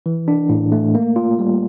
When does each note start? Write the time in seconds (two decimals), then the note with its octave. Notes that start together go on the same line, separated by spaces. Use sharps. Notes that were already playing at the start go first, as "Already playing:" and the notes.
0.06 E3
0.28 D4
0.49 A2
0.72 A3
0.95 A#3
1.16 F4
1.39 G3